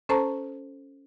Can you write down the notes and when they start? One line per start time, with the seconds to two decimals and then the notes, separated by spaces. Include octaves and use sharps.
0.09 C#4 A4 C5 A5 A#5 C#6